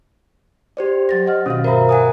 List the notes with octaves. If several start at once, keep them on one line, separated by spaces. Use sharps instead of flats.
G4 C5 D5
F#3 A6 A#6
D#5 F#5 F6
B2 D#3 C#4 F#4 F5
G2 A#4 C5 E5 A#5
F#5 G#5 D#6